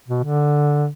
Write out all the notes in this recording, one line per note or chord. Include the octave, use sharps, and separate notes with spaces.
B2
D3